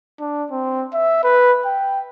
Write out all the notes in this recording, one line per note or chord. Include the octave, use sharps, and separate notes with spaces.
D4
C4
E5
B4
G5